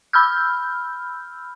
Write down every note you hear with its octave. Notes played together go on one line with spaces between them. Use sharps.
B5 E6 F6 G6